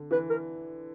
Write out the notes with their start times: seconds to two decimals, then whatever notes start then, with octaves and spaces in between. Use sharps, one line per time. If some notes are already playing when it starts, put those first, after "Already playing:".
Already playing: D3
0.11 E3 B4
0.30 A#4